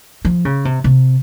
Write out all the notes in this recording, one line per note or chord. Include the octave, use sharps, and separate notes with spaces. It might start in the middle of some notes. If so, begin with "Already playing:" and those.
F3
C#3
C3
C3